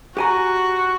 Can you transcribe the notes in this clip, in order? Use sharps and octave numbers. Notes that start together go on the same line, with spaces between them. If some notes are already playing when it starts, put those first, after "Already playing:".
F#4 G4 G#5 A#5